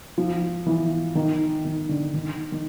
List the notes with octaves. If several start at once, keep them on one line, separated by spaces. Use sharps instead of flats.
F3
E3
D#3
D#3
D3
D#3
D#3